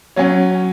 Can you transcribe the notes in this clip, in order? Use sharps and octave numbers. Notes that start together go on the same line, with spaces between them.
F#3 C#4 C#5